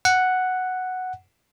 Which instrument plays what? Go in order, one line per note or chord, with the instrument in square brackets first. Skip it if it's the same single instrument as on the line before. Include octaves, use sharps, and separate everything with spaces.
[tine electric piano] F#5